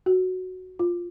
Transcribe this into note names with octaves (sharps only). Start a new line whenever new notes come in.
F#4
F4